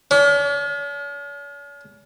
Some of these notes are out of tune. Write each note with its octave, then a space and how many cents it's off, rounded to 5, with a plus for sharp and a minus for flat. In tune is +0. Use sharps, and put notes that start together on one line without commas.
C#4 +45